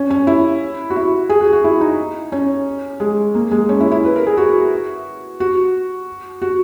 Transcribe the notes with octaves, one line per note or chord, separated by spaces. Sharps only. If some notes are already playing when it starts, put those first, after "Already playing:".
Already playing: C#4
C#4
E4
F#4
E4
G#4
F#4
F#4
E4
D#4
C#4
G#3
A#3
G#3
C#4
E4
E4
B4
A#4
G#4
F#4
F#4
F#4